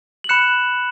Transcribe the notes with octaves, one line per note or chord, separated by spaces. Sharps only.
F#7
B5 F#6 C#7 E7